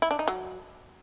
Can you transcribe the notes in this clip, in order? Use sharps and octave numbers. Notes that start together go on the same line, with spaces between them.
E4
D4
D#4
F#3